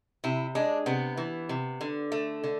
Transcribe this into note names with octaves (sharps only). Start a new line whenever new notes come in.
C3 E4
G#3 D4
C3 B3
E3
C3
D3
A3
D3